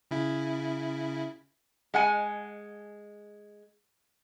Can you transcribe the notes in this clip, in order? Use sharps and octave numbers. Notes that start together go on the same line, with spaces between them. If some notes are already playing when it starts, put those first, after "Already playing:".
C#3 E4
G#3 F#5 G#5